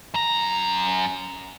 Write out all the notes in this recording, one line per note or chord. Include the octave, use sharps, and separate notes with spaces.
F#2 A#5